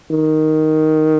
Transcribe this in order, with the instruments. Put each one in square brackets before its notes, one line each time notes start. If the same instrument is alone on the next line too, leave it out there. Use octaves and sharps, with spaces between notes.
[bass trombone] D#3